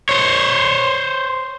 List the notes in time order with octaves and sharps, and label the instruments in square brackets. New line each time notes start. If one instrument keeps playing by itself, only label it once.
[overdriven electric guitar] C5 C#5